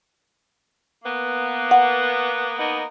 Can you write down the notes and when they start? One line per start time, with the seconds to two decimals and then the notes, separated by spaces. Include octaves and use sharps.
1.04 A#3 B3
1.71 F#5
2.58 A#3 B3 D#4